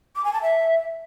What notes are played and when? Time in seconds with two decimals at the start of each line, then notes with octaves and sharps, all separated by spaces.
0.16 D6
0.24 G#5
0.33 A5
0.42 E5